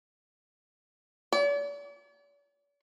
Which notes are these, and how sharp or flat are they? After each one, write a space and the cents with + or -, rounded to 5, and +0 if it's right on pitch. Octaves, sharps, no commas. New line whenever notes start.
D5 -45